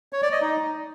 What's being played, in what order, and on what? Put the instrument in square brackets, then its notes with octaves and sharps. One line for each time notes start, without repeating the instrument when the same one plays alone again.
[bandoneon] C#5
D5
D#5
D#4